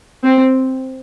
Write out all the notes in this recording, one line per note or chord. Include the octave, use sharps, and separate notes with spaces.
C4